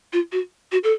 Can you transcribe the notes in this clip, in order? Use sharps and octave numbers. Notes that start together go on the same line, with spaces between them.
F4
F#4
F#4
A4